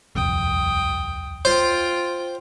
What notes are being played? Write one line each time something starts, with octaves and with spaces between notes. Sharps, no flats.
D#1 C2 F2 G5 D#6
F4 C5 G5